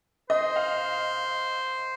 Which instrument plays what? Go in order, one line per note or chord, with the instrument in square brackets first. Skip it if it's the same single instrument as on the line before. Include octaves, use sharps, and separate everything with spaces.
[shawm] C5 [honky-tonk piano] D#5
[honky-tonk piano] F5